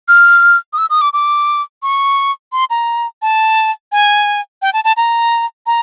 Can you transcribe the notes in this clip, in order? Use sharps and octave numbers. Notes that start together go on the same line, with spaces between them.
F6
D#6
E6
D#6
D6
D6
C#6
C6
A#5
A5
G#5
G5
A5
A5
A#5
A#5